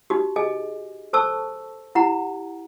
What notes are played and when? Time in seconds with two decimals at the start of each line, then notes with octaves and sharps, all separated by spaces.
0.10 D#4 F#4 G4
0.36 G#4 D#5 G#5
1.13 A4 C5 A5 C#6 E6
1.95 E4 G4 F#5 A#5